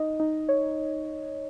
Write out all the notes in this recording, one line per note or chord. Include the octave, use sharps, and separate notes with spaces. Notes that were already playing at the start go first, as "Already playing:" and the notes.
Already playing: D#4 D#5
D#4 D#5
C#5